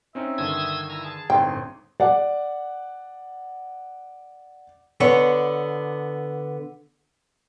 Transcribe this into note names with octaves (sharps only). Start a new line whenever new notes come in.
C4 C#4 D#4 E5
G2 D3 D#3 D#6 E6 G#6
E4 G#5 A#5 E6
G#4 A5
G1 A2 C4 D#4 G5 C6
D5 F#5
D3 B3 C#5